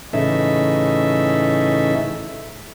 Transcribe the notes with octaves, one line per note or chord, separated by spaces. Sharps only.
A2 C#3 E3 D#4 A4 E5